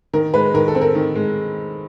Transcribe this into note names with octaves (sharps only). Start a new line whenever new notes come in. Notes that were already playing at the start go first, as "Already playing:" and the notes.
D#3 A#4
G#3 B4
D#3 A#4
A4
C4
A#4
D#3
G#3